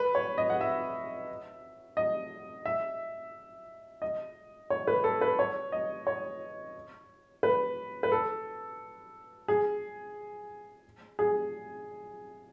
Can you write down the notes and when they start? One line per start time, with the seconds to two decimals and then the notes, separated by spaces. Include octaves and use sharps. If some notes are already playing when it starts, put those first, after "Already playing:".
Already playing: B4
0.15 C#5
0.38 D#5
0.50 F#5
0.61 E5
1.97 D#5
2.65 E5
4.02 D#5
4.70 C#5
4.87 B4
5.04 A4
5.21 B4
5.39 C#5
5.72 D#5
6.07 C#5
7.43 B4
8.03 B4
8.12 A4
9.48 G#4
11.19 G#4